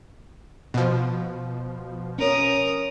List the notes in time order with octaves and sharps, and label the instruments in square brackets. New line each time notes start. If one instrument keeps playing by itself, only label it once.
[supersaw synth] B2 F3
[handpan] C#4 C#5 [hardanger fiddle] A#4 D#6